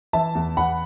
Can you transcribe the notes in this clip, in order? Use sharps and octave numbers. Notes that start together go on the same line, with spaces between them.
E3 E5 A5
E2
E2 F#5 B5